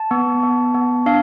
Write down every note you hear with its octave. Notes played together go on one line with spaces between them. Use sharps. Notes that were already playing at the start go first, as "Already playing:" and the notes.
Already playing: A5
B3
B3
B3
D4 F5